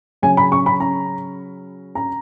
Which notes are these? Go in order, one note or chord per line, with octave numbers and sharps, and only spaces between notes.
C#3 F#3 C#4 G#5
B5
C#6
B5
A#5
A#5